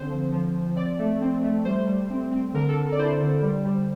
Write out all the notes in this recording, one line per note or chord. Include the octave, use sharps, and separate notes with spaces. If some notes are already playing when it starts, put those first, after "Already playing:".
Already playing: D3 C4 C5
F3
F3
F3
C4 D5
A3
C4
A3
G3 C5
G3
C4
C4
D3 A#4
A4
D3
D5
E4 C5
D3
G3
G3